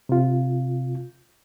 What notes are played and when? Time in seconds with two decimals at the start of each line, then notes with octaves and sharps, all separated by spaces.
0.09 C3 F4